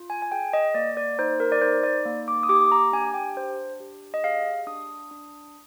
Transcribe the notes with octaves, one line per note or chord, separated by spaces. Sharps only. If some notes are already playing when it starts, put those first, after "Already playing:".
Already playing: F4
G#5
G#5
G#4 G5
D#5
A#3 D5
D5
D#4 C5
A#4
D5
D#4 C5
D5
A#3
D6
D#6
G4 D6
A#5
D4 G#5
G5
D4 C5
G4
D#5
G#4 F5
D4 D#6
D4